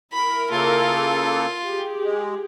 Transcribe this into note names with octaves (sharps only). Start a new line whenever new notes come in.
E4 A#4 B5
C#3 A#3 F4 A4
G4 G#4
G#3